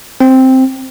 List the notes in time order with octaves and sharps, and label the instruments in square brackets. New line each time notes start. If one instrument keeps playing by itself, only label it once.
[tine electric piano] C4